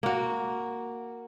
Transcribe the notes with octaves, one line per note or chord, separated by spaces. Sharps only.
A#3 F#4